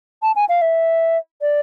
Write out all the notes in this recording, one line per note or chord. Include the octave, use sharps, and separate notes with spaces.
A5
G#5
F5
E5
D5